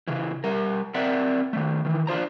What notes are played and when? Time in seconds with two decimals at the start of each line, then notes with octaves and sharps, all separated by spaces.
0.08 C#3 E3
0.44 G3 A#4
0.94 C4 A#4 D5 E5 F#5
1.53 D#3 A3
1.85 D#3 E3
2.07 D4 F4 C5 A#5